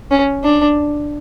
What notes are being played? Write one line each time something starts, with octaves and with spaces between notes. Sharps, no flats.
C#4
D4